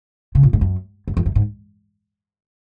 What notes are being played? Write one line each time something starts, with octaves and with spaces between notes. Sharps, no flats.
C#3
A#2
G#2
F#2
F#2
F2
F#2
G#2